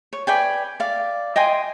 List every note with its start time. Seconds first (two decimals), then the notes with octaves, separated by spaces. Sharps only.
0.13 C#5
0.27 B4 D5 G5 G#5
0.80 D5 F5
1.36 D#5 G5 G#5 C6